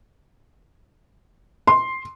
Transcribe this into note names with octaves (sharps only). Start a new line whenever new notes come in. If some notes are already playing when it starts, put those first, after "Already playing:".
C6